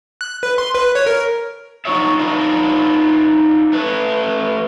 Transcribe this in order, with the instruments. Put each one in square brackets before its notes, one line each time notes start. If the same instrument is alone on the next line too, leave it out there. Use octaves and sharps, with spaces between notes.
[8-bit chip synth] F#6
B4
C6
B4
C#5
A#4
[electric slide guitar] D4 D#4 F4 F#4 C#5 E5
D4 D#4 F4 B4 C#5 D#5
A3 B4